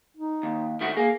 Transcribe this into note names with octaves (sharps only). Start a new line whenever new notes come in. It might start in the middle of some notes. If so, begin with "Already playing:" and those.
D#4
D#2
D#3 A3 F#4
A#3 G#4